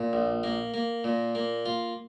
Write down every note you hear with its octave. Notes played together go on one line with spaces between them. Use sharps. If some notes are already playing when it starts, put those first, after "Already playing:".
Already playing: A#2
A#1
A#3
A#3
A#2
A#3
F4